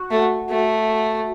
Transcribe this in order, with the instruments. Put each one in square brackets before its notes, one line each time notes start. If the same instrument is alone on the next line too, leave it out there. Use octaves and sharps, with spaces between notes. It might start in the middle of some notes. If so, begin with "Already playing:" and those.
Already playing: [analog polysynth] F#4
[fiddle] A3
A3